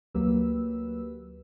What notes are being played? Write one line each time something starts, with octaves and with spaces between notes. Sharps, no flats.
D2 F#3 A#3 G4 B4 E6